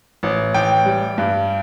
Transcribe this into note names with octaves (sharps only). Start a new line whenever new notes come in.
A1
A1 G5
G3
G2